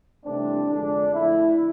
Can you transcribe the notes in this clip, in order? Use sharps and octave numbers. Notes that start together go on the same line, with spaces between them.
C2 C3 E3 A3 C4 D4
F2 D3 G#3 D4
F2 D3 A3 E4